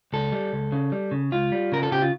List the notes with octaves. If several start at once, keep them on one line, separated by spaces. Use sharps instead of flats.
C#2 A4
G3
C#2
C#3
G3
C#3
C#2 F4
G3
C#3 A#4
A4
C#3 G4
F4